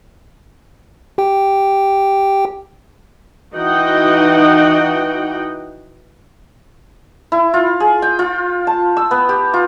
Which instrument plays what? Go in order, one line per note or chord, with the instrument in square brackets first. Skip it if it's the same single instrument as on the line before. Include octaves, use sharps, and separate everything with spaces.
[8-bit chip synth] G4 G5
[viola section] E3 D#4 F#4 D#5 F#5 G5
[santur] E4
F4
G#4
G5
F4
A5
E6
B3
G4
F4